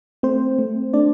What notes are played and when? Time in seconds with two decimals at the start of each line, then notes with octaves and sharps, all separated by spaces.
0.23 A3 C4 C5
0.59 A3
0.94 A3 D4 D5